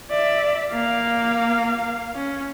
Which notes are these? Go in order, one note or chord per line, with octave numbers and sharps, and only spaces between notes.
D5 E5
A#3 F5
C#4